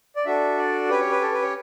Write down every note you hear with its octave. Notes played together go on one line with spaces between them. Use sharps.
D5
D4 F#4 A4 E5
D5
C#4 G4 B4
C#5
B4
A4
B4
C#5